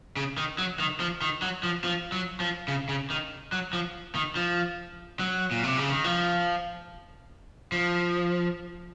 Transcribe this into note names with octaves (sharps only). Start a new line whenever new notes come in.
C#3
D#3
F#3
D#3
F3
D#3
F#3
F3
F3
F#3
F3
C#3
C#3
D#3
F#3
F3
D#3
F3
F#3
A#2
C3
C#3
D#3
F3
F3